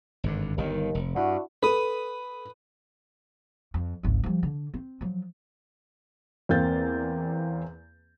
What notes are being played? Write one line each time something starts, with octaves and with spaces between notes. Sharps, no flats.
G#1 G2 D3
G1 D#2 D#3
F1
G2 D4 E4 F#4
A4 B4 D#6
F2
G#1 C#2
F3 G3
D3
C4
F3 F#3
E2 A#3 C4 F5 G6 A6